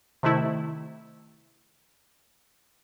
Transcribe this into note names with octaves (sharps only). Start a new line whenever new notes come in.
C3 D#3 A3 E4